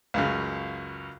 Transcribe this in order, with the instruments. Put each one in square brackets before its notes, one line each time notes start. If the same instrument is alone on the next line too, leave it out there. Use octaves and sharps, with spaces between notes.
[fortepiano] C#2 F#2 C#3